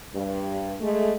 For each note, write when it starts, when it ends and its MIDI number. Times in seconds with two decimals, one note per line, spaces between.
0.14 0.74 43
0.80 1.13 56
0.80 1.13 57